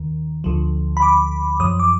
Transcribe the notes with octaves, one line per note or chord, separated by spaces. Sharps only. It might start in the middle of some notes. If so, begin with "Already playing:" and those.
Already playing: D#2 D#3
D2 D3 F3
B5
D6
F#2 F3 D#6
D6